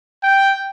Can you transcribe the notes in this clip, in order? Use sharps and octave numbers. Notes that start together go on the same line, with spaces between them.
G5